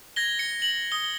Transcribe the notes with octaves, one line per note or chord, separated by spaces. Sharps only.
G#6 A#6 G7
C#7
F#7
D#6 G7